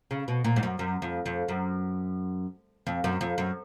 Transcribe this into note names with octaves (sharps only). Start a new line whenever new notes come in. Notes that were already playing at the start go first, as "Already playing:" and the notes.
C#3
B2
A#2
G#2
F#2
F#2
F2
F2
F#2
F2
F#2
F2
F#2